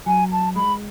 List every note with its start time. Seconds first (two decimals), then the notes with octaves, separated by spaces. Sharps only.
0.06 F#3 G#5
0.32 A5
0.56 G#3 B5